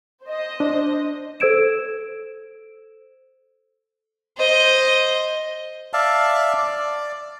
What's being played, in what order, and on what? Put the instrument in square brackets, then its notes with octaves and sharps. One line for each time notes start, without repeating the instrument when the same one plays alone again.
[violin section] C5 D#5
[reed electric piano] D4
[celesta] A4 C5 E6 G#6 D7 E7
[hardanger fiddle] C5 D#5
[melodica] D5 E5 F5 A5
D5